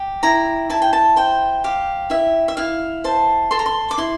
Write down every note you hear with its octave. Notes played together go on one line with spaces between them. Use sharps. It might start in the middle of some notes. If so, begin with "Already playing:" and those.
Already playing: G4
E4 A#5
E4 A5
G5
A5
C5 G5
G4 F5
E4 E5
E5
E4 F5
C5 A5
A4 C6
A#5
C6
D6
E4 C6